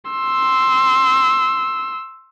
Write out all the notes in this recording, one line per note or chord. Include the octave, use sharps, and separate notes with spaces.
C6 E6